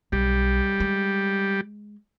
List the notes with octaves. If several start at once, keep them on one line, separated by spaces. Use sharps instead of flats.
B1 G3
G#3